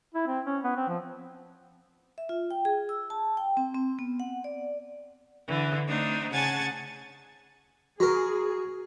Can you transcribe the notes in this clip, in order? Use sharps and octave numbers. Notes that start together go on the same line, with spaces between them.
E4
C4
C#4
B3
C4
F3
E5
F4
G5
G#4
E6
A5
G5
C4
C4
B3
F#5
D5
D3 E3
A3 C4 D4 D#4
C#3 F#5 G#5 A5 G#6 A6
F#3 F#4 G#4 A#4